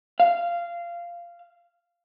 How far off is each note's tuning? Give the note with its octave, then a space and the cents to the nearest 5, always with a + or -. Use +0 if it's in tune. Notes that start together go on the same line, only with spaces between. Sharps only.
F5 -15